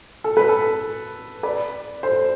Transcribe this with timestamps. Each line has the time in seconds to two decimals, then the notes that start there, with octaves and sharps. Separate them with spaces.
0.24 A4
0.37 B4
0.49 A4
1.43 B4 D5
2.03 A4 C5